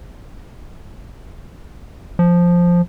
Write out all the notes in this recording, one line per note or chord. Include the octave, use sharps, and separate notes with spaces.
F3